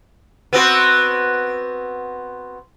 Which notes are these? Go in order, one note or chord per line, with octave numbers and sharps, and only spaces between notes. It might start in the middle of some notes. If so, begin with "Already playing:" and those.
B3 C4 F#4